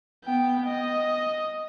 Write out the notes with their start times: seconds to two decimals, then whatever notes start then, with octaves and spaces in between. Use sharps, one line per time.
0.25 B3 G5
0.67 D#5